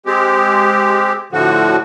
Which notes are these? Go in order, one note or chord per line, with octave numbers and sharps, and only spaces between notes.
G#3 C4 G4
A2 D3 F3 F#4